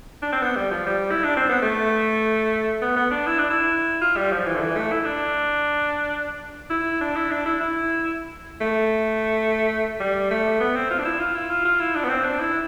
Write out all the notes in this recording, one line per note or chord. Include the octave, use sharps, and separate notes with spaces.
D4
C4
B3
G3
F3
G3
E4
D4
C4
B3
A3
B3
B3
D4
E4
D4
E4
F4
G3
F3
E3
D3
E3
A3
E4
D4
E4
D4
E4
D4
E4
E4
A3
G3
A3
B3
C4
F4
D4
E4
F4
E4
F4
F4
E4
D4
B3
C4
D4
E4